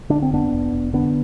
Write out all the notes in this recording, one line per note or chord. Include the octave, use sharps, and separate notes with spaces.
D3 D4
C4
F1 B3 D4
F1
F1
D3 B3 D4